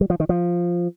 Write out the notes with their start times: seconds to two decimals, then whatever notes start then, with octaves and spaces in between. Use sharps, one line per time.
0.01 G3
0.10 F3
0.20 D#3
0.29 F3